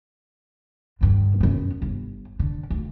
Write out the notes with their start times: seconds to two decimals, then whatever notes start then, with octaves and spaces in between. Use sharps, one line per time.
1.01 G2 D3
1.40 F#2 B3
1.82 G1
2.39 D3
2.70 D2